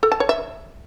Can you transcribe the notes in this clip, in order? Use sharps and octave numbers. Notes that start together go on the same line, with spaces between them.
A4
A5
C#5
E5